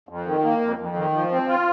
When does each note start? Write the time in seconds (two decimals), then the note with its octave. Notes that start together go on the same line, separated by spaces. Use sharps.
0.09 F2
0.26 D#3
0.44 A#3
0.61 F2
0.79 F2
0.96 D#3
1.14 F3
1.31 C4
1.48 F4